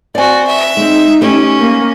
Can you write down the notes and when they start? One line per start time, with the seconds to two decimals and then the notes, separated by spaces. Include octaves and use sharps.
0.15 C4 F#4 D5 G#5
0.47 E5
0.77 G#3 C4 D#4
1.21 A3 C#4 G4
1.60 A#3